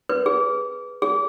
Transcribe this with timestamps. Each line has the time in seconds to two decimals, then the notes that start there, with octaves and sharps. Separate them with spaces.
0.09 B4
0.26 G#4
1.02 G#4